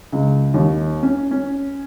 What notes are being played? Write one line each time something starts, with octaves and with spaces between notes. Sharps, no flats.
C#2
D#2
C#4
C#4